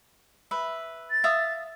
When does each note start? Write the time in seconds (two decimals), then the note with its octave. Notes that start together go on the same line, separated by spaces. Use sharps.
0.51 B4 E5
1.10 A6
1.24 E5 F5 D#6